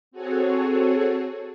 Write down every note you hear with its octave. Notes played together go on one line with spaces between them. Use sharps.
C4 F#4 G#4 A4 C#5